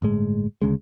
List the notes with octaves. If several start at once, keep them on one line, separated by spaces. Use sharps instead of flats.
G1 A2 G#3
D2 C#3 G#3